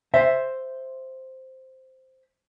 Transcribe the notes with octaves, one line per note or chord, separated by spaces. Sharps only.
C5 E5